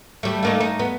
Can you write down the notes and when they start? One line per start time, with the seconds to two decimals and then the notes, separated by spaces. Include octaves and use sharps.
0.23 G3 A3
0.43 A3 A#3 D#4
0.60 D#4
0.79 B3